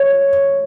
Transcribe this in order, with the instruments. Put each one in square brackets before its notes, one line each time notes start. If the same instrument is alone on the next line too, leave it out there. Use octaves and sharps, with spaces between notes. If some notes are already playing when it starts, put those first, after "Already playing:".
Already playing: [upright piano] C#5